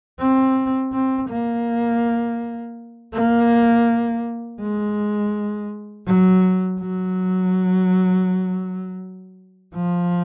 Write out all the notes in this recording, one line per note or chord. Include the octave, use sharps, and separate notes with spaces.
C4
C4
A#3
A#3
G#3
F#3
F#3
F3